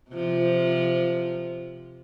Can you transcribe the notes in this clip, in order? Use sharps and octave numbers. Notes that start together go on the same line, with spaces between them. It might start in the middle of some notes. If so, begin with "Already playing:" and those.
C3 F3